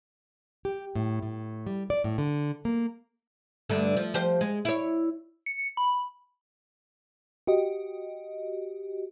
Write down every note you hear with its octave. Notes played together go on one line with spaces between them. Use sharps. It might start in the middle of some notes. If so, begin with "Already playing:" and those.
G4
A2
A2
G3
D5
A2
D3
A#3
G2 D3 A3
F3
F3 G4 C5
G#3
E4 C#5
C#7
B5
F#4 G4 D#5